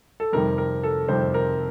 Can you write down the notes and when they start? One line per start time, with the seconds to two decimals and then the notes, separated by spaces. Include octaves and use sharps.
0.20 A4
0.33 F2 C3 D#3 G3 A#4
0.58 A#4
0.83 A4
1.08 F2 C3 D#3 G3 C5
1.34 A#4